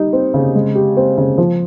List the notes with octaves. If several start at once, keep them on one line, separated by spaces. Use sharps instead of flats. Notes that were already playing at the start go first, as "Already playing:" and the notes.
Already playing: G3 D#4
C4
C#3
G#3
G4
C4
C#3
F3